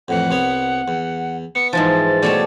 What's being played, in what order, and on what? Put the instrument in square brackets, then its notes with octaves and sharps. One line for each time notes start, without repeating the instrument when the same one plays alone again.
[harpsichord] F2 A2 E3 [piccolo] F#5
[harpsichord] C2 B3 C#5
E2
[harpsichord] B3 [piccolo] C#7
[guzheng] G#2 E3 F3 [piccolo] A6
[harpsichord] B2 A3 A4 [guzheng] G3 C#5 A5